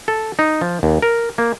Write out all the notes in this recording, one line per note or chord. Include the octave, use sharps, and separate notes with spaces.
A4
D#4
F3
D#2
A#4
A#3